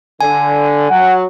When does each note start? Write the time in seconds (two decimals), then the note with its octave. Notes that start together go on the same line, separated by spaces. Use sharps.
0.21 D3 G#5
0.90 F#3 F#5